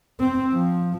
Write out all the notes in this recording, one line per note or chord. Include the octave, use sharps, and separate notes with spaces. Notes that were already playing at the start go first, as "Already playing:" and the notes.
C4
F3